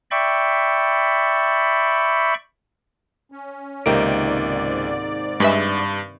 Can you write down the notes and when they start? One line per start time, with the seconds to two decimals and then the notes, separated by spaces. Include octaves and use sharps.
0.11 D5 E5 G5 B5 C#6
3.32 C#4
3.86 C#2 G#2 C3 D#3 A#3 D5 D7
5.40 G2 G#3 B4 E5